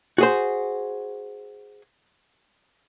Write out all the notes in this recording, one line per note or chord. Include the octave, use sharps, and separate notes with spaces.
F#4 G#4 C5